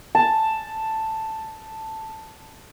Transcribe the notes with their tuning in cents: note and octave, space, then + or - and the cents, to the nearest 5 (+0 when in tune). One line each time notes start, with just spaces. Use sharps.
A5 +5